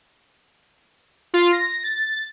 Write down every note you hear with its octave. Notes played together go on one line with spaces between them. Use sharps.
F4
A#6
A6